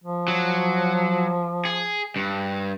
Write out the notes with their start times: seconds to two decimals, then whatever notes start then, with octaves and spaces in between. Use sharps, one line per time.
0.04 F3
0.28 F#3
1.65 G#4
2.16 G2